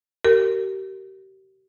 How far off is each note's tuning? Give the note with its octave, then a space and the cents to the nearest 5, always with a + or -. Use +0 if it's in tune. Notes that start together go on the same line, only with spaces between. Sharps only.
G4 -35 A#4 -25